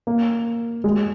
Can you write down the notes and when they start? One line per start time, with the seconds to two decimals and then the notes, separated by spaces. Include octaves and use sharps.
0.07 A#3
0.84 G#3